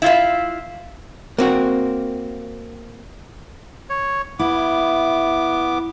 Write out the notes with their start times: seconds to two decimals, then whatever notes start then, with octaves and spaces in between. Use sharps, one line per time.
0.02 E4 F4 E5
1.38 A#3 C4 F#4
3.90 C#5
4.39 B3 E4 D6